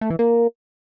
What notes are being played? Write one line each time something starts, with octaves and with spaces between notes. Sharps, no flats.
A3
E3
A#3